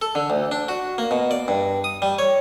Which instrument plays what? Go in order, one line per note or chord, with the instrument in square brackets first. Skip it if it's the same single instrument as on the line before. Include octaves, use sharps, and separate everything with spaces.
[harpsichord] A4
D3
D2
D4
F#4
A#3
B2
D5
G2
D#6
G3
C#5